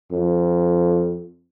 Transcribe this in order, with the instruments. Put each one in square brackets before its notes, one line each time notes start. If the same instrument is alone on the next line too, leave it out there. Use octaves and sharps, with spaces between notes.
[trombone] F2